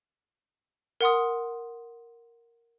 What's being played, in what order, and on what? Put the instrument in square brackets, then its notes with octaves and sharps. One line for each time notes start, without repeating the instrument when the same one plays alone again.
[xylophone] A#4 F#5 C6 D#6